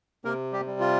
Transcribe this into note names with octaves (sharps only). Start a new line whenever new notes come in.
C3 A#3 A#4
G3 G4
G3
F4